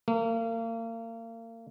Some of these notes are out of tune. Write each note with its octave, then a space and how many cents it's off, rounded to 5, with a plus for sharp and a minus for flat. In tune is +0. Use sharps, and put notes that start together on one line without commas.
A#3 -35